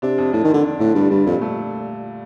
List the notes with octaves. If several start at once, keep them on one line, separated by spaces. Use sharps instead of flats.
C3 D4
F2
F2 A2
D#3
F2
D3
D4
A2 D3
G2 G3
G2 G3
F2 A#2
A3